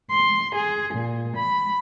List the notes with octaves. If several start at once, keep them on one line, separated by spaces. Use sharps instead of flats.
C6
G#4
A#2
B5